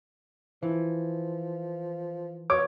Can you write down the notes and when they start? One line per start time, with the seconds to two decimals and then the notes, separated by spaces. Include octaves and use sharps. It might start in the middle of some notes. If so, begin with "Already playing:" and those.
0.63 E3 F3
2.50 B2 C#5 D6